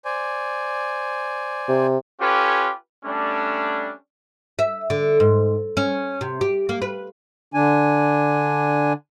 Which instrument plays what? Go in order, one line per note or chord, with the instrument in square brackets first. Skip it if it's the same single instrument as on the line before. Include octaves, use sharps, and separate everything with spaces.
[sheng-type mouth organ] C5 D5 G#5
[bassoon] C3
[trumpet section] C#4 F4 G4 A4 B4 G#5
G3 A3 C#4 D4
[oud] E5
D3
G#2
C#4
C3
G4
A#3
B4
[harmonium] D3 D4 G#5